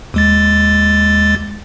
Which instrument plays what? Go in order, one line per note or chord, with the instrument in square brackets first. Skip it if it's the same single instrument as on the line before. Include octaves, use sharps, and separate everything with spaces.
[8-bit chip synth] D#2 G#3 A6